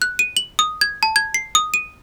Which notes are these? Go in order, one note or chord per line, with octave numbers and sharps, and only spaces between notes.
F#6
D#7
F#7
D#6
G#6
A5
G#6
C7
D#6
D#7